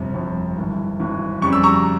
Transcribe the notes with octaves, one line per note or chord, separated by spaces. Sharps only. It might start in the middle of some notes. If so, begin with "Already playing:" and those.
Already playing: G1 F2 C3
G1 F2 C3
G#1 G2 E3
G#1 G2 E3
F2 C#3 G3 C#6
E6
A#5 C#6